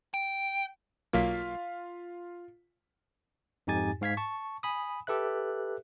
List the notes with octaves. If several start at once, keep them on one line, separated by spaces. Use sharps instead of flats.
G5
B1 F#3 A#3 F4 F5 B6
F2 G#2 D#4 G4 G#5 A6
G#2 F5 G#6 B6
A5 C#6
G#5 B5 D#6
G4 A4 B4 E5 F#6